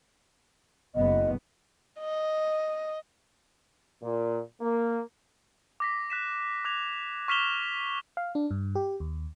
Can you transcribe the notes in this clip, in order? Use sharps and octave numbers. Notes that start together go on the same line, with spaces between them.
F#1 B3 D#5
D#5
A#2
A#3
D6 A#6 B6
F#6 B6 E7
D6 F#6 G#6 F7
C#6 F6 B6 E7 F7 G7
F5
D4
G2
G4
D#2